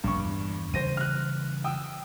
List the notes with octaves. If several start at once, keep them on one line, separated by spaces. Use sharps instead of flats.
A#1 G2 D3 C#6
E2
C#3 E3 G3 C5 A#6 D#7
F6 F#6
G5 D#6 E6